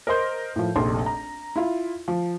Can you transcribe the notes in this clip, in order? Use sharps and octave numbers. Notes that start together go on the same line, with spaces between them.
A#4 C5 D#5 C6 G6
A2 F3
F1 A#1 C6
A#5
E4 F4
F3